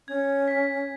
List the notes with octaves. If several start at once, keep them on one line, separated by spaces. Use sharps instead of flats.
C#4 G#6
B6